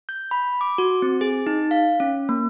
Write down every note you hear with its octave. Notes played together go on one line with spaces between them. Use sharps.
G6
B5
D6
F#4
C4
G#4
D#4
F5
C#4
A#3